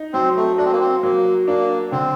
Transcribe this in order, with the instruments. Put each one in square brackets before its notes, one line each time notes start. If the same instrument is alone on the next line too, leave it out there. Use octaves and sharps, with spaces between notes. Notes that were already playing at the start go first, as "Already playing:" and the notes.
Already playing: [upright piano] D#4
[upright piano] F#3 [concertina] C4
[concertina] A3
[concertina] D4 [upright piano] F#4
[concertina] C4
A#3
C4
[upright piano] F#3 [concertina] A#3
[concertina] A#3 [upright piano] D4
[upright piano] D3 [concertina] C4